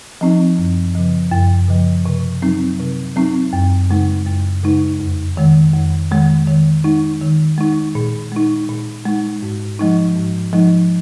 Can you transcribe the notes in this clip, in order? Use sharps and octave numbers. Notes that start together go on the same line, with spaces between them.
F3 C4 D#4
F#2
C#3 F3
F#2
C#3 F3
C3
F#3 C4 D#4
C3
F#3 C4 D#4
F#2
C#3 G#3 D#4
F#2
C#3 G#3 D#4
F2
D#3 G#3
F2
D#3 G#3
D#3
G#3 D#4
D#3
G#3 D#4
A#2
G#3 D#4
A#2
G#3 D#4
G#2
F3 G#3 D#4
G#2
F3 G#3 D#4